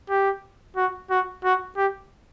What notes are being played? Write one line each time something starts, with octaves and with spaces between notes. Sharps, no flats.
G4
F#4
F#4
F#4
G4